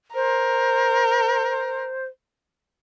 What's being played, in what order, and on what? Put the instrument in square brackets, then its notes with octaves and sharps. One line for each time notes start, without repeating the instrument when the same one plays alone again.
[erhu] A#4 [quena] C5